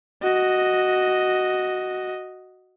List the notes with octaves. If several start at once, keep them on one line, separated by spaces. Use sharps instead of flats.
F#4 D#5